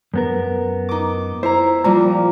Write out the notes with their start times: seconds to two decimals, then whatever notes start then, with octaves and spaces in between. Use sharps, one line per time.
0.14 F#2 B3 A#4
0.89 D#4 D6
1.43 E4 C5 A#5
1.84 A#2 F3 G3 A#5